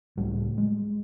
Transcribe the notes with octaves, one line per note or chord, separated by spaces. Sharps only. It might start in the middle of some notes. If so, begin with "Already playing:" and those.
C#2 A2 G3
G#3